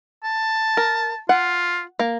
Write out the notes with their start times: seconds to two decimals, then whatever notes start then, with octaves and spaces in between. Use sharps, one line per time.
0.24 A5
0.77 A#4
1.29 F4 F#5
1.99 A#3